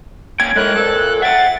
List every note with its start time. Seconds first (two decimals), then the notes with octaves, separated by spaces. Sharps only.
0.40 A#3 C#4 G5 G#6
0.56 A2 G#3 A#4 F#6
0.76 F2 A#2 A4
1.22 E5 F#5 G5 A6